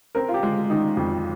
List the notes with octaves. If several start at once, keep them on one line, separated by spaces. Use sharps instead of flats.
C4 A#4
F4
G4
G#3
D#3 D#4
F2